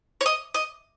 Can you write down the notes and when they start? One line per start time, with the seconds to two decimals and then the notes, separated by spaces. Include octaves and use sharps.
0.21 C#5
0.26 D#5
0.54 D#5